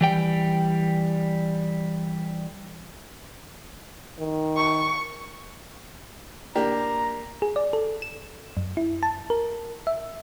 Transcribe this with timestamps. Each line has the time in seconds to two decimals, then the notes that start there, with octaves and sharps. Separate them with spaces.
0.01 E3 G3 G5
4.19 D#3
4.57 C#6
6.56 A#3 D4 G4 A#5
7.42 G#4
7.56 D5
7.73 A4
8.02 E7
8.57 F#2
8.77 E4
9.03 A5
9.30 A#4
9.87 E5